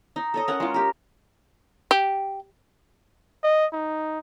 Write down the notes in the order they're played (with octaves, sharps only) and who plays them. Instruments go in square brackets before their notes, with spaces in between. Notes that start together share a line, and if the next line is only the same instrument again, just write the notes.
[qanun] D#4
A4 C#5 D#5
C#4 A#4 C#5 F#5
G#3 F4
G4 A#4
[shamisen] G4
[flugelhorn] D#5
D#4